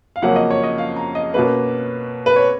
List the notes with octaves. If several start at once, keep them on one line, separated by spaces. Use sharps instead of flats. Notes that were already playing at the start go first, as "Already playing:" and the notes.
F5
F2 C#3 F#3 A#3 C#4 F#5
D#5
C#5
D#5
F5
A#5
D#5
B2 A#3 C#4 B4
B4
C#5